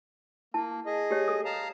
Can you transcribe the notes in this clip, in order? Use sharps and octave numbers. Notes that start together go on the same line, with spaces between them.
A#3 E4 A5
G#4 D#5
G4 C#5
A4 D#6
F5 A5 A#5